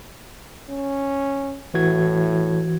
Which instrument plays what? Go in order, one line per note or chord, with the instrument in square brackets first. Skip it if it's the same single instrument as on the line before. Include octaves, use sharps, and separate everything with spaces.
[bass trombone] C#4
[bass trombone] A2 [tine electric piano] E3 F#4 G#6